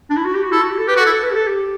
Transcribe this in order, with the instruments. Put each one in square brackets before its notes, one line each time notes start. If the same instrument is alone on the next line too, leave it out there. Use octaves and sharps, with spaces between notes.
[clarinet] D4
E4
F#4
G4
F#4
[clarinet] E4 [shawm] A4
[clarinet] F#4
G4
A4
[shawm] G4 [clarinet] B4
[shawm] F#4
[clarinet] A4
[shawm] E4
[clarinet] A4
B4
G4
A4
G4